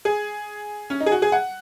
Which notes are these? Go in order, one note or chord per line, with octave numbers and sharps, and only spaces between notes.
G#4
C#4
D#4
G#4
F#4
G#4
F#5